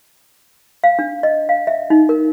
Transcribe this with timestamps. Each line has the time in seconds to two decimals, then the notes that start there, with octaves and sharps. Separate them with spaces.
0.84 F5
0.99 D4
1.23 D#5
1.49 F5
1.67 E5
1.90 D#4
2.09 A#4